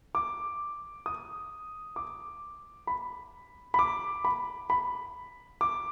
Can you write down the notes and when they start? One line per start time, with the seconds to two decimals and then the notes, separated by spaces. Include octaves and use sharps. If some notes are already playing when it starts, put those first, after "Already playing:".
0.15 D6
1.06 D#6
1.96 D6
2.87 B5
3.74 B5
3.79 D6
4.25 B5
4.70 B5
5.61 D6